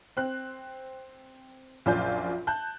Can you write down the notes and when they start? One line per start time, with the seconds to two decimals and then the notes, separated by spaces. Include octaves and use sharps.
0.17 C4 F#6
1.86 A#1 F#2 F4 D5 G#5 G6
2.47 A5 F#6 G6